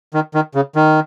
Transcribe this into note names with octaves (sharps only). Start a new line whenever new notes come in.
D#3
D#3
C#3
D#3